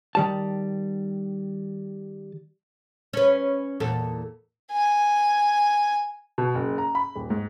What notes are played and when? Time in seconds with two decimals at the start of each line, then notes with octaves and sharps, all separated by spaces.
0.15 D#3 G3 A5
3.13 C#4 B4
3.80 E2 A#2 A4
4.72 G#5
6.38 B2
6.55 F#1
6.78 A#5
6.95 B5
7.15 D#1
7.30 G#2